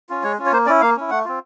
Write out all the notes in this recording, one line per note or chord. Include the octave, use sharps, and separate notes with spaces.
C#4 F4
G#3 C#5
C#4 F4
C#5
A#3 C5
C#4 E4 D5
A#3 F5
C#4 E4
A3 F#5
C4 F4